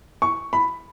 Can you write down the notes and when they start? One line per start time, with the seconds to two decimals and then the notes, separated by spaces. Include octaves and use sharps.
0.22 C#6
0.53 B5